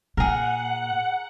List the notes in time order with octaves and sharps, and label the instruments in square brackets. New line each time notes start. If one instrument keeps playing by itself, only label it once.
[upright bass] A#2 [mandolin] G#4 A#4 [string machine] F#5